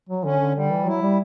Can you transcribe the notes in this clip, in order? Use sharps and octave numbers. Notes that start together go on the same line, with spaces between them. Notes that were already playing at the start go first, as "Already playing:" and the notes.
F#3
D3 C#4
D3
D3 G3
E3
F#3 E4
G3